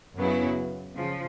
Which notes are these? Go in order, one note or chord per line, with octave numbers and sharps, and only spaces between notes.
F#2 C#3 F#3 B3 E4
C#3 F3